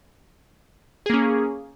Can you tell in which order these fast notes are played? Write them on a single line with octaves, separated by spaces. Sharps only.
G#4 A#3 C#4